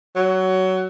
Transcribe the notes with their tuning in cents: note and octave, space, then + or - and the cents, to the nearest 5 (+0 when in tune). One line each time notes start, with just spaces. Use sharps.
F#3 +20